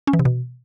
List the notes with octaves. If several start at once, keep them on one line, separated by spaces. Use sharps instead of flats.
C#4
E3
C3
B2